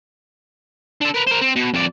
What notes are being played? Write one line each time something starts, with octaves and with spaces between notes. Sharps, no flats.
D4 A4
A#4 B4
A#4 C5
C4
B2
F2 D5